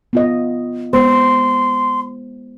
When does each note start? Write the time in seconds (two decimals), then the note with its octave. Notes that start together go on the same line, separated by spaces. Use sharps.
0.13 B3 F4 D#5
0.93 G#3 B3 C5 C6